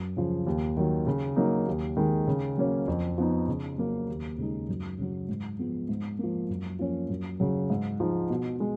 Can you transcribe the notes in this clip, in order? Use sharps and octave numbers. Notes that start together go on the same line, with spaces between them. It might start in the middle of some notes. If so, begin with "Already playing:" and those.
Already playing: F#2
C#3 F3
D#2
D#3 F#3
C#3
F#3 A#3 D#4
D#2
D#3 G#3
C#3
F#3 A#3 C#4
F2
F3 B3 D#4
C#3
F#3 A#3
D#2
C#3 G#3 D#4
F#2
C#3 F#3
G#2
F3 G#3 B3
G#2
F3 A#3
F#2
F3 A#3 C#4
F#2
C#3 F#3
G#2
F3 G#3 D#4
B2
G#3